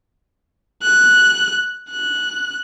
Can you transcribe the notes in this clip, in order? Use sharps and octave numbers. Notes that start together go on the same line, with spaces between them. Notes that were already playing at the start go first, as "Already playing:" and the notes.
F#6
F#6